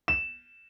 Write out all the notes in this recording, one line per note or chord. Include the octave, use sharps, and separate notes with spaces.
E7